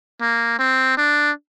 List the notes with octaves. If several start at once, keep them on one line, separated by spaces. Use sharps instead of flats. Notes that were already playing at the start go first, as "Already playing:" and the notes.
A#3
C4
D4